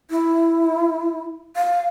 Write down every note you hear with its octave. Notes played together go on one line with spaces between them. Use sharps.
E4
F5